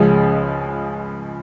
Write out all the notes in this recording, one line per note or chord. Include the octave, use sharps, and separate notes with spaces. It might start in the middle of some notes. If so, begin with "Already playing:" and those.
Already playing: C#2 C#3 F3 G#3